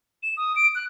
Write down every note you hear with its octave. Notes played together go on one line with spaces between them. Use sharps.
E7
D#6
D7
F#6